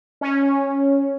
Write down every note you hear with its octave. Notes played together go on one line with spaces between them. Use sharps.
C#4